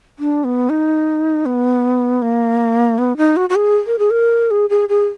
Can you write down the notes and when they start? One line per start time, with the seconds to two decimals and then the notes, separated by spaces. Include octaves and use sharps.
0.19 D4
0.44 B3
0.70 D#4
1.46 B3
2.22 A#3
2.98 B3
3.17 D#4
3.36 F#4
3.50 F#4
3.55 G#4
3.87 A#4
3.99 G#4
4.11 A#4
4.51 G#4
4.70 G#4
4.89 G#4